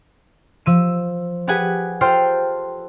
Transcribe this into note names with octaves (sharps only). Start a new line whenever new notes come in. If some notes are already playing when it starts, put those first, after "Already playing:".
F3 E6 D#7
G4 G#4 B4 F#5 G#5
F4 A4 C5 G5 C6 F6